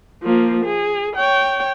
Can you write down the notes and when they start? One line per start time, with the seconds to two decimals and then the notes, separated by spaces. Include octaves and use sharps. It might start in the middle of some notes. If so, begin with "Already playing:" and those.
0.23 F3 A#3
0.65 G#4
1.16 C#5 G5